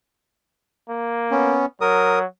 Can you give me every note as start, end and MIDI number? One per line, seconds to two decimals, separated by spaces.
0.89 1.57 58
1.31 1.66 59
1.31 1.66 61
1.81 2.25 54
1.81 2.19 70
1.81 2.19 87